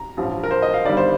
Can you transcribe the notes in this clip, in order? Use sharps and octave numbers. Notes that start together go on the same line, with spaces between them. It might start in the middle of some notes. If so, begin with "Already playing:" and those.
Already playing: A#5
A1 G2 F3
A#4
C5
D#5
F5
G1 G2 D#3 G3 D5
C5